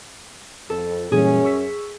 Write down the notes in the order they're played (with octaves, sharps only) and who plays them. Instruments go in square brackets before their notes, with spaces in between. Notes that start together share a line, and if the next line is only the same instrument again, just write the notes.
[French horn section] F2 [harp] A4
[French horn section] F#2 C#4 [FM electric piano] A#2 E3 G3 [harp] G#4
[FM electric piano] C#6 E6 B6